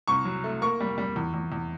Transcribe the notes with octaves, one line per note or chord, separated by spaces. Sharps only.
C2 C#6
F#3
A3
A#3 C#6
G3
G3
E2
E2
E2